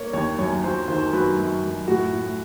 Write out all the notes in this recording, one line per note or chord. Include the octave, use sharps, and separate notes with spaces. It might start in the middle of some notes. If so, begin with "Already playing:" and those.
Already playing: A#3 C#5
D#2 C#5
F#2 C#5
F#3 C5
D#3 C5
F#3 B4
F#2
F#2
A2 F#4
A2